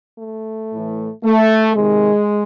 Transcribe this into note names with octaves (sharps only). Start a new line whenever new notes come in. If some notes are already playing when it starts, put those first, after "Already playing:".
A3
A2 E3
A3
C3 D#3 G#3